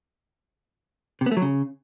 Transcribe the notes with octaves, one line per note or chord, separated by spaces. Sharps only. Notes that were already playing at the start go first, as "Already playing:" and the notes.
C3
B3
A3
F#3
C#3